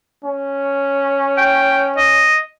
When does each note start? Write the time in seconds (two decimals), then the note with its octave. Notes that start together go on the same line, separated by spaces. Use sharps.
0.24 C#4
1.38 G5
1.97 D#5